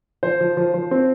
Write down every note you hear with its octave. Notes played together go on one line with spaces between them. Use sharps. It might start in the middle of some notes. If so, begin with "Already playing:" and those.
F3 C5
F3
F3
F3
C4